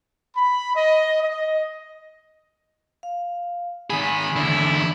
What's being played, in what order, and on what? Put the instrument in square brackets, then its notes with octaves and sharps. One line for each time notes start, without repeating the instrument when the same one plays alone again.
[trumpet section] B5
D#5
D#5
[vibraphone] F5
[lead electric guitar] D#3 G#4 [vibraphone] G#5 [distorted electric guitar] B5
[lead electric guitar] E2 D3 [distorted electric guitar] E4